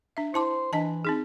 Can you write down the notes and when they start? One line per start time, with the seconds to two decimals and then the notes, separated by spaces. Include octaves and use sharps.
0.17 D4 E5
0.34 E4 C5 A5 D6
0.73 E3 D4 D#5 A5
1.05 C4 D#4 G#4